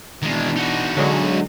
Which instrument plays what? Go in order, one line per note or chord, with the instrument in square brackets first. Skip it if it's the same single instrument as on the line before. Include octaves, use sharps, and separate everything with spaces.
[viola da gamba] B2 E3 D4 [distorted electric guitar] D#3 G#3
[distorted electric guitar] D#4 F#4
[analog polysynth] D3 F#3 G#3